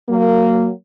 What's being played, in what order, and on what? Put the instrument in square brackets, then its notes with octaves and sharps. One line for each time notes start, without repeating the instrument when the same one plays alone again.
[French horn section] F#3 A#3